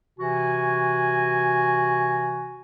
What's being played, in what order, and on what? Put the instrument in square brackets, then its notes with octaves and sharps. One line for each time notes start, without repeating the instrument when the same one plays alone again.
[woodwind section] C3 E3 F#4 [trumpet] G#5